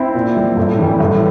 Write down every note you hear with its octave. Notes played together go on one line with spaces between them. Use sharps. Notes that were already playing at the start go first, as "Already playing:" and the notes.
Already playing: C4 E4
A#2
G3
A2
E3 G3
A2